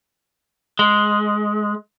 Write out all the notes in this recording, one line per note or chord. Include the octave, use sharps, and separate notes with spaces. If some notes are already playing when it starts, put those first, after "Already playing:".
G#3